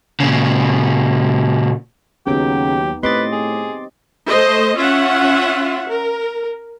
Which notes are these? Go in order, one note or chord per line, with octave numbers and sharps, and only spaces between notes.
A#2 C#3
D#2 C#3 F#3 B3 D#4 G4 G5
A2 C4 G4 B4 D#5 C6 D6 A6
G#4
A3 C5 D#5
C#4 F4 E5 F#5
A#4